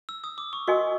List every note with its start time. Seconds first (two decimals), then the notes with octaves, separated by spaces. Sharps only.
0.09 E6
0.24 D#6
0.38 D6
0.53 C#6
0.67 F#4 A#4 D#5 G#5 C6